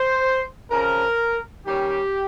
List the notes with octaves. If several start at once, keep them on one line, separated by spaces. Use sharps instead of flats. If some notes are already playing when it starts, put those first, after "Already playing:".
Already playing: C5
C#3 F3 C4 A#4
D#3 G3 C#4 G4